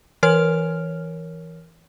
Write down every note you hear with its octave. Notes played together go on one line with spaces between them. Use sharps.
E3 A#4 C#5 F6